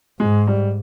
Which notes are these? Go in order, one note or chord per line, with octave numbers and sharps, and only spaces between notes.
G#2 G#3
G3